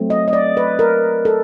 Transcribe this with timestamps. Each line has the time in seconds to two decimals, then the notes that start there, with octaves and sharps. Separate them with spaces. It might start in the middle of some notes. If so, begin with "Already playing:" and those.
Already playing: F#3 A3 C4
0.10 D#5
0.28 D#5
0.33 D5
0.57 B4
0.79 A#4
1.25 A4